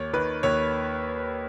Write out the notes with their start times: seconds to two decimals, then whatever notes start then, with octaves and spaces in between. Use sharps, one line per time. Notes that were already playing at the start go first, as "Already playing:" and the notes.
Already playing: D#2 C#5
0.13 D#3 B4
0.43 D#2 C#5